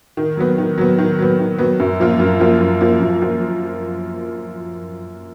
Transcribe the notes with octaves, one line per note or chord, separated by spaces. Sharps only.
D#3
F#3 B3
D#3
F#3 B3
D#3
F#3 B3
D#3
F#3 B3
F#2
F3 A#3 F4
F#2
F3 A#3 F4
F#2
F3 A#3 F4
F#2
F3 A#3 F4